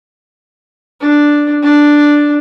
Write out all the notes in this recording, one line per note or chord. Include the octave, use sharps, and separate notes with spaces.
D4
D4